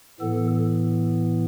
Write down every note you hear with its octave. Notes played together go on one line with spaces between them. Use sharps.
A2 E3 B3 A4